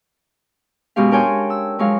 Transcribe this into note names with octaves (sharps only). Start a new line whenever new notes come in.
F#2 B2 G#3 F#4 G4 F5
D4 A#4 C#5 G5 G#5 C6
E6
F3 F#3 G#3 C#5 F5